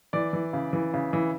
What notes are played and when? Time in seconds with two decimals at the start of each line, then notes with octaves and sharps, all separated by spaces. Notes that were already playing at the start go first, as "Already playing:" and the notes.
0.13 E3 D5
0.33 E3
0.53 C#3
0.73 E3
0.94 C#3
1.13 E3